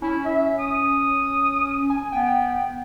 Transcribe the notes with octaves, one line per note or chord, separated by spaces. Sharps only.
C#4 E4
E5
D#6
G#5
B3 G5